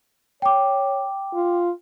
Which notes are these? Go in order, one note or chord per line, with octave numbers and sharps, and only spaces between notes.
C#5 G5 D6
F4